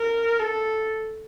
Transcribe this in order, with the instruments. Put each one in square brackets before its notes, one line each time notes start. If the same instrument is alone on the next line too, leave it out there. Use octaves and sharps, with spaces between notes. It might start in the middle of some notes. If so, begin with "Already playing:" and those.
Already playing: [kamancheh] A#4
A4